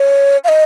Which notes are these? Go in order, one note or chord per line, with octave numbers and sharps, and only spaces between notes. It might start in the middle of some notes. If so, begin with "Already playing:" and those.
Already playing: C#5
F5
D#5